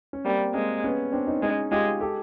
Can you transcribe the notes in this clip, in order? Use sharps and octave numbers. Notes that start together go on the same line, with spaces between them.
C#4
G3 A#3 C4
G#3 A#3 C4
B3 C#4
C4 D4
C#4 D#4
G#3 C#4 D#4
G#3 F4 G4
G4 A4